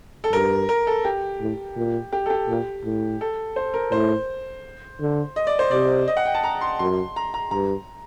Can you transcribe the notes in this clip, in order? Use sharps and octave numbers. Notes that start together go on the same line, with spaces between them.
A4
G2 A#4
A#4
A4
G4
A2
A#2
G4
A4
G4
A#2
A2
A4
C5
A#4
A2 C5
D3
D#5
D5
C5
C3 D5
D#5
F#5
G5
A5
A#5
C6
F#2 C6
A#5
A#5
G2 A#5